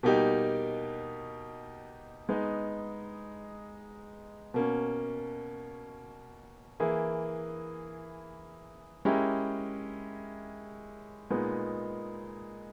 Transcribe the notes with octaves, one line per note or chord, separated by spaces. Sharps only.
B2 G3 A#3 D#4 G4
G#3 B3 D#4
B2 A#3 C#4
E3 A#3 E4 G#4
G#3 C#4 E4 G4 A#4
A#2 G#3 B3 D#4